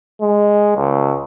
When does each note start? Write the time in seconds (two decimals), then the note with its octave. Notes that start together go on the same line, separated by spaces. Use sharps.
0.21 G#3
0.76 C#2